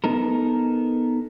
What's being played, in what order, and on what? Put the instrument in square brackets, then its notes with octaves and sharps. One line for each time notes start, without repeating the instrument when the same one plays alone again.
[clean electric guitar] B3 D#4 A4 A#4